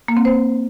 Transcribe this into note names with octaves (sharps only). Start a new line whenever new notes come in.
A#3
C4
C5